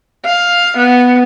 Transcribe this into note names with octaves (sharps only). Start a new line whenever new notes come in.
F5
B3